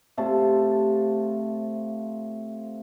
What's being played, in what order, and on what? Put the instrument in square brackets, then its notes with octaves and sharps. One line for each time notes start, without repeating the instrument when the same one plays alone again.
[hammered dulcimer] C3 A3 F4 A5